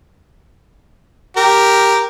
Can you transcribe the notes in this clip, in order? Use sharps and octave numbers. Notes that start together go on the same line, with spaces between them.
G4 A#4